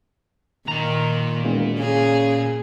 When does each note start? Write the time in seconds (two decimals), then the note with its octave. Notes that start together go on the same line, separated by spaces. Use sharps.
0.68 A#2 D#3 A#5
1.43 E1
1.79 C#3 G#4